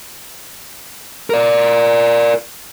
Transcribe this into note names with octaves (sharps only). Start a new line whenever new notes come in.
A#4 D5